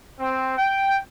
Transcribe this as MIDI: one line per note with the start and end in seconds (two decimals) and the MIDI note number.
0.19 0.57 60
0.57 0.98 79